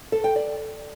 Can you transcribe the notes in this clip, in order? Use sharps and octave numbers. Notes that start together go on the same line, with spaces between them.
A4
G5
D5